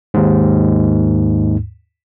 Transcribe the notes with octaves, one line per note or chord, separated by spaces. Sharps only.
D#2 G#2